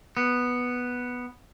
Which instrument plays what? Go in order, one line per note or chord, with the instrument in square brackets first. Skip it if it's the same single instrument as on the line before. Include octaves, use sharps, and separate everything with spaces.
[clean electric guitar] B3